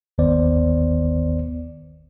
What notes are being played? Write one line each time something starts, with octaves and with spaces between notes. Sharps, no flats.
G1 D#2 D#3 B3 C5 D5